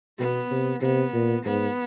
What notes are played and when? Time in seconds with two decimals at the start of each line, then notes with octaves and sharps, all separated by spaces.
0.19 B2 B3
0.51 C3
0.82 C3 B3
1.13 A#2
1.45 G#2 B3